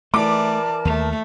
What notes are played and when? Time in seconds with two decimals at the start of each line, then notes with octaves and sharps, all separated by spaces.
0.14 E3 A3 A#4 D5 A5 D6
0.85 D#2 A3